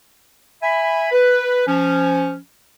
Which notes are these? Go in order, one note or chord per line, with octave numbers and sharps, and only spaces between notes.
E5 G#5 B5
B4
F3 C#4